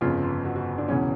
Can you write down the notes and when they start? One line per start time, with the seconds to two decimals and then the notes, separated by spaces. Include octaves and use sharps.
0.01 G1 F2 C#3 F4
0.23 F4
0.45 F#4
0.56 F#4
0.78 D4
0.88 E1 E2 C#3 E3 C#4